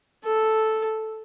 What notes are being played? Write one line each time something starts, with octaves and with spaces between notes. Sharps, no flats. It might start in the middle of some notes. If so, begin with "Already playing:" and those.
A4